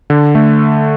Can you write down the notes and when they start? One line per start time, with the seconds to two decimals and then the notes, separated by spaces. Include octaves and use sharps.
0.10 D3
0.35 A3